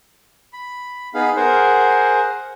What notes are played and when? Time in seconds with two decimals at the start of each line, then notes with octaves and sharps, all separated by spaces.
0.53 B5
1.14 B3 D#4 G#4 F5 B5
1.36 G#4 A#4 C5 F#5